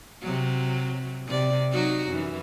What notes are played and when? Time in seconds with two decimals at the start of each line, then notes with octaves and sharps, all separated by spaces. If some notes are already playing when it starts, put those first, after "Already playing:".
0.22 C3 F#3
1.27 C3 D5
1.72 F#3 D#4 F#4
2.09 F#2 E3